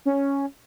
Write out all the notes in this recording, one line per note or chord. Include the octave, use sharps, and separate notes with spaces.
C#4